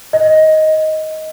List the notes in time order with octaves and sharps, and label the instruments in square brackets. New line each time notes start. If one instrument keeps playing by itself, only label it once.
[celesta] D#5